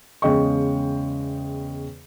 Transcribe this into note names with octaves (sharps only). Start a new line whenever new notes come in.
E2 C#3 G#3 D#5 G5 C#6